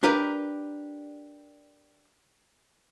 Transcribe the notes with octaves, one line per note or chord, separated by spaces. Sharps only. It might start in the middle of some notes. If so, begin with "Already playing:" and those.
D4 G4 A#4 B4 D5